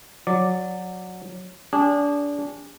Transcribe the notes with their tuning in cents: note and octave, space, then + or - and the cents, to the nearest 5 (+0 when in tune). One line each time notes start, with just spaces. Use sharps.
F#3 -15 D5 +0
D4 -25 G#4 -40